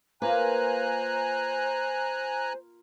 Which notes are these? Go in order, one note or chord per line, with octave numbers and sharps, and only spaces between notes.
A#3 F4 B4 C5 F5 G#5 A#5 F#6